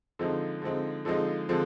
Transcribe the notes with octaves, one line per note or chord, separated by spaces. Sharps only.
D3 F3 G#3 C4 D#4
D3 F3 G#3 C4 D#4
D3 F3 G#3 C4 D#4
D3 F3 G#3 C4